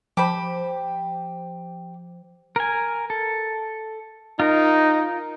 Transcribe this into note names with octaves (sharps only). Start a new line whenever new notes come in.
F3 G4 C5 B5
A#4 G#5
A4
D#4 F4 A#4